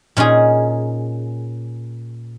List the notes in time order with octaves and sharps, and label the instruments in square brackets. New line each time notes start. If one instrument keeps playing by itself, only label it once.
[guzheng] A#2 C#4 D#4 G#4